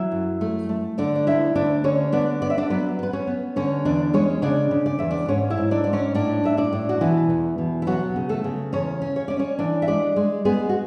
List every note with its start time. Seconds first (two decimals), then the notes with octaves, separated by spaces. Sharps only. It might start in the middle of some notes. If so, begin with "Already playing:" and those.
Already playing: F#3 E4 E5
0.12 F#2
0.41 A3
0.69 A3
0.98 D3 D4 D5
1.16 D5
1.27 D2 E4 E5
1.55 D2 D4 D5
1.84 D3 C#4 C#5
2.12 B3 D4 D5
2.42 B3 D5
2.50 E5
2.58 D4 D5
2.70 F#3 B3 B4
2.99 B3 B4
3.13 C#4 C#5
3.27 B3
3.56 D3 C#4 C#5
3.85 E2 D4 D5
4.13 G#3 C#4 C#5
4.42 C#3 D4 D5
4.71 C#3
4.86 D5
4.99 E2 E5
5.11 D4 D5
5.28 G#2 C#4 C#5
5.50 E4 E5
5.58 G#2
5.71 D4 D5
5.84 G#2 D5
5.93 C#4 C#5
6.15 A2 D4 D5
6.44 A2 E5
6.57 D4 D5
6.72 A2
6.89 F#4
7.01 B2 E3 E4
7.30 E2
7.58 B2
7.82 E4
7.87 F#3 B3 F#4
8.16 C#3
8.29 A3 A4
8.44 C#3
8.73 E2 C#4 C#5
9.02 C#4
9.16 C#5
9.28 C#4 D5
9.39 C#4 C#5
9.59 E3 D4 D5
9.82 E5
9.88 G#3 D4 D5
10.16 G#3
10.45 G#3 B3 G#4
10.69 F#4